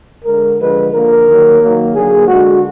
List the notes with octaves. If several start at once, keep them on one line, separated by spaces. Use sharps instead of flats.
D3 G#3 A#4
D3 F3 G#3 B4
D3 F3 A#3 A#4
D#3 F#3 A#3
D#3 F#3 A#3
D3 F#3 A#3 G#4
D3 G#3 F#4